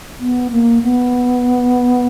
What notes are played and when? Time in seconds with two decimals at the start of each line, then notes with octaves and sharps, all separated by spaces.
0.20 B3
0.51 A#3
0.83 B3